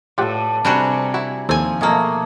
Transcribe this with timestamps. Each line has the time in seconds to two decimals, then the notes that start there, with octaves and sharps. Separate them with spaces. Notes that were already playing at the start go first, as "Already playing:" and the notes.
0.18 A2 F4 G4 A4 D5 F#5
0.65 C3 G3 D4 F#4 G#5 A#5
1.14 E4 F#4
1.49 D#2 F3 C4 A4 C5 G#5
1.81 B2 A3 A#3 G#4